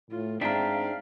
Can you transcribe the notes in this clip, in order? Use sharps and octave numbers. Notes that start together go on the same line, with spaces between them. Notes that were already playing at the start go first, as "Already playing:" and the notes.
A2 F4
G#2 C4 D4 E5 F5 G5 A#5 B6